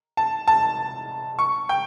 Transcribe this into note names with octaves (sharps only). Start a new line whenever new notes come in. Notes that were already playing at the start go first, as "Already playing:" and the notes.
A5
A5
C#6
G5